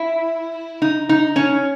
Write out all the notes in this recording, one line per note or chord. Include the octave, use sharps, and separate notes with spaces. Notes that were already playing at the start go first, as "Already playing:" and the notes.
Already playing: E4
D#4
D#4
C#4